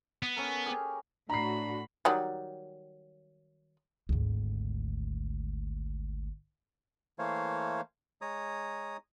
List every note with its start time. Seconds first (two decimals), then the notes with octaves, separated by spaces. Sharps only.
0.23 B3
0.37 C#4 A4 A#4
0.66 G4 G#4
1.30 A2 D4 F#4 A#5 B5 C7
2.05 D#3 F#3 G3
4.09 G#1 D2
7.19 E3 A3 A#3 C5 C#5 F5
8.22 G#3 C#5 A#5 D#6